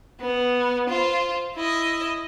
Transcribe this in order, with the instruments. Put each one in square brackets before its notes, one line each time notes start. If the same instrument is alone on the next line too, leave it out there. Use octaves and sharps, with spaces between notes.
[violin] B3
F4 C5
E4 D#5